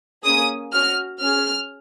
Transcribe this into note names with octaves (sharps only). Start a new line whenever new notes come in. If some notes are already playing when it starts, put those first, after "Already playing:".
A#3 C#4 G#4 D#6
C#4 F#4 F6
C#4 G#4 F6